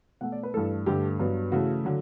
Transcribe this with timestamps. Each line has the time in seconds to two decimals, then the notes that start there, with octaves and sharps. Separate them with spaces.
0.21 B2 A3 F#5
0.32 D5
0.43 B4
0.54 G2 E3 A3 A4
0.86 G2 D3 A3 G4
1.19 G2 F#3 B3
1.52 C#3 E3 A3 F#4
1.85 D3 F#3